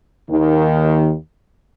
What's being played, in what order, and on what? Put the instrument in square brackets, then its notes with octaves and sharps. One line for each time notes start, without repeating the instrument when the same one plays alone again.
[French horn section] D#2 D#3